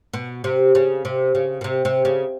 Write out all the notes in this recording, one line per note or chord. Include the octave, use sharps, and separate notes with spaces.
B2
C3
C#3
C3
C#3
B2
C3
C3
C#3